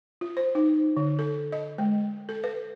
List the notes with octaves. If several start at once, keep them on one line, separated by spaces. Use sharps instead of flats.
F4
C5
D#4
D3
A4
D#5
G#3
A4
B4